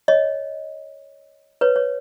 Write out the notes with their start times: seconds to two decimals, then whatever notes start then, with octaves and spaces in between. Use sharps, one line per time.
0.08 C#5 D#5
1.61 B4 C#5
1.76 C#5